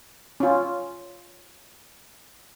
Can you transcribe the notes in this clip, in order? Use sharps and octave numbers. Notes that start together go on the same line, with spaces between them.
C#4 F4